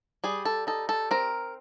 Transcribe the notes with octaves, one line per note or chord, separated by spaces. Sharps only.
G3 G#4
A4
D#4 A4
A4
C4 A#4